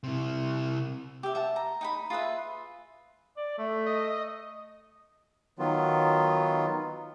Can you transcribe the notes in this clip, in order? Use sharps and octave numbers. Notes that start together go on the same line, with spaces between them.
C3 E4
G4 E5
E5 F#5 A5
A#5
D#4 G5 B5
F4 G#4 B4 E5
D5
A3
D#5
D#3 F#3 B3 F4